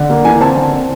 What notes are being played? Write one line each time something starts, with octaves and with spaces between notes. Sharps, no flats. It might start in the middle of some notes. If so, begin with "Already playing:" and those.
Already playing: D3
A#3
E3 G#5
C4 A5
D3
C4